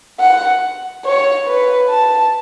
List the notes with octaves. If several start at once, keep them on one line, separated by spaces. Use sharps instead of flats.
F#5
C#5
B4
A5